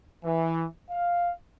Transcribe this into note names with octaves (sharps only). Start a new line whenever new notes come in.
E3
F5